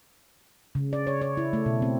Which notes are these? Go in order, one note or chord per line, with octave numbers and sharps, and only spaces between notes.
C#3
D5
C#5
C#5
E4
A3
B2
C4